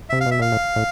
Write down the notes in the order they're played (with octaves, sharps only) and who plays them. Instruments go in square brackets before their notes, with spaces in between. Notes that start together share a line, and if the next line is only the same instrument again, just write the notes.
[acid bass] C3 [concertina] E5
[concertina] F5
[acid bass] B2
[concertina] E5
[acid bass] A#2 [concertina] F5
[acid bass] A2
A2